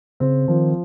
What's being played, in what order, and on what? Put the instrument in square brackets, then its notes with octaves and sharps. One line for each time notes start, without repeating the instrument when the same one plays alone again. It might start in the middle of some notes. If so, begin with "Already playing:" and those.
[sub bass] C#3 [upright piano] C4
[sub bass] D#3 [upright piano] F3